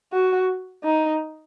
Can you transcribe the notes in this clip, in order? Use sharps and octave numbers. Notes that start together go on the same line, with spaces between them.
F#4
D#4